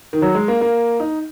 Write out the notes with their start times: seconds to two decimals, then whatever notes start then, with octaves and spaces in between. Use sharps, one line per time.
0.13 D#3
0.22 F#3
0.35 G#3
0.48 A#3
0.61 A#3
1.00 D#4